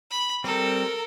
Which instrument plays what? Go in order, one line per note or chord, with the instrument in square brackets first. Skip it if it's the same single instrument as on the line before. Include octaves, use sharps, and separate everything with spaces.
[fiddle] B5
[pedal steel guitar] G3 C4 [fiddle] A4 A#4